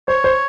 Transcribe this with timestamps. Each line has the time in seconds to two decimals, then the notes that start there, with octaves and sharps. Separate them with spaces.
0.08 C5 C#5
0.24 C5